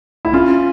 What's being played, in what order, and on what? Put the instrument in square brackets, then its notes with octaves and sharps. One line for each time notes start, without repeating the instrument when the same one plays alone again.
[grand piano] E4
[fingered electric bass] C#4 [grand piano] F4